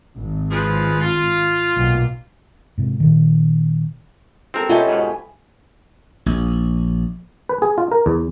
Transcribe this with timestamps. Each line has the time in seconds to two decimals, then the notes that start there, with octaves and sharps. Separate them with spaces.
0.17 G#1
0.51 F3 G#4 B4
1.01 F4
1.76 B1 A#2
2.78 G#2 C3
3.00 A#2 D#3
4.54 C4 G4 A4 A#4 C5
4.69 C#4 D#4 F4 A4 B4 E5 G#5
4.88 G#2 B2
6.26 A#1
7.49 B4
7.62 G#4
7.78 F4
7.92 A#4
8.06 E2